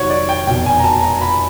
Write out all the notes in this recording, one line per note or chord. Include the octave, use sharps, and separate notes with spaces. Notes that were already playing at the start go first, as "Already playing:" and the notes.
Already playing: F1 D#2 D#3 F#3 C#5 F#5
D5
G5
F1 E2 B2 G5
G#5
A#5
A5
A#5
B5